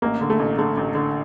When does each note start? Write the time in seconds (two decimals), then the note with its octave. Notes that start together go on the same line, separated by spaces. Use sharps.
0.02 A1 A#3
0.21 D3
0.30 A3
0.39 A1
0.58 D3 A3
0.77 A1
0.95 D3